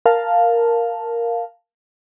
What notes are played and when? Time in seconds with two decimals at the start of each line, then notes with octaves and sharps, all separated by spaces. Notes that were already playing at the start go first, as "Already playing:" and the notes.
0.06 A#4 F5 A5